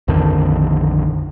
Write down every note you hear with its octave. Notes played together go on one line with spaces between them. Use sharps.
A#1 F2 D3 D#3